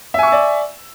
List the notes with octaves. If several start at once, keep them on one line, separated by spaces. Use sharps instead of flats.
D5 E5 G#5 C#6 E6